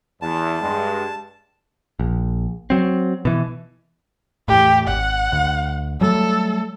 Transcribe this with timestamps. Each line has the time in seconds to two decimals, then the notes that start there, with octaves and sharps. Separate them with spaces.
0.22 E2 A5
0.61 G2 G#3
2.00 A#1
2.70 F#3 C4
3.25 B2 E3
4.48 E2 A2 G4
4.88 G#1 F#5
5.32 D2
6.01 F#3 G3 A3 A4